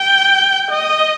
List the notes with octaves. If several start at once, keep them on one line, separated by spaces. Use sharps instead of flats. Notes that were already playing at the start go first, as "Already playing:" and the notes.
Already playing: G5
D#5